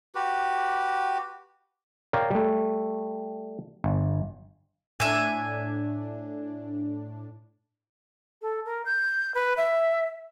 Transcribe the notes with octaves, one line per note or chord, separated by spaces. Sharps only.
F#4 G4 B4
A#4 C#5 D5 F5 G5
G3 A3
G1
A2 D4 E5 G#5
A4
A#4
G6
B4
E5